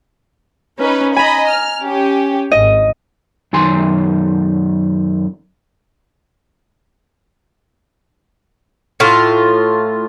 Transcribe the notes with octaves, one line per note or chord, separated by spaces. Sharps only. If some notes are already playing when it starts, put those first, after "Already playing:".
C#4 D#4 B4
D#5 G#5 A#5 B5
F6
C#4 G4
G#1 D#5
F#2 D#3 G#5 C6
A2 F4